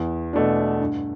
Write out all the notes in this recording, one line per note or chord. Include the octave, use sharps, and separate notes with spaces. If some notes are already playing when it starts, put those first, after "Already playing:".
Already playing: E2
B2 A3 D4
G2